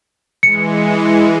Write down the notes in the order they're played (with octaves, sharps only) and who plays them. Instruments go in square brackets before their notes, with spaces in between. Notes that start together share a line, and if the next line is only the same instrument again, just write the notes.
[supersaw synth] E3 G#3 [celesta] C#7